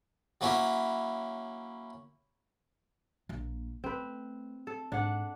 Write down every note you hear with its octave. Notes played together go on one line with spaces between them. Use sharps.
F#3 A#3 C#4 E4
A#1 A#3
A3 C4 B4
A4
G#2 D4 F#5